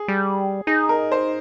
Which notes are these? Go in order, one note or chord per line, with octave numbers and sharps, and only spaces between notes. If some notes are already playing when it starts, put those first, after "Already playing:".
Already playing: G#4
G3
D#4 G#4
A#4
C5